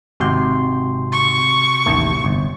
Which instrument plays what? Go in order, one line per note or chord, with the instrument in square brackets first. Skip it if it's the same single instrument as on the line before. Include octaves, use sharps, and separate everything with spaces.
[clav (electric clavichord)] G#1 G5 [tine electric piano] C3 F#4 C6
[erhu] C#6
[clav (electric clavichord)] A1 D#2 A3
G1